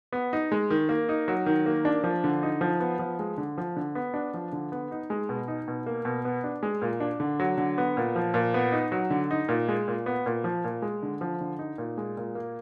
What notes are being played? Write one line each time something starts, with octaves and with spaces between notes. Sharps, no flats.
B3
D#4
G#3
D#3
A#3
D#4
F#3
D#3
A#3
D4
F3
D3
D#4
F3
B3
F3
G#3
D3
F3
D3
B3
D4
F3
D3
B3
D#4
G#3
B2
D#4
B2
A#3
B2
B3
D4
G#3
A#2
D4
D3
F#3
D3
B3
A#2
F3
A#2
B3
D#4
F#3
D3
D#4
A#2
G#3
A#2
B3
A#2
F3
A#2
G#3
D3
F3
D3
D#4
A#2
G#3
A#2
A#3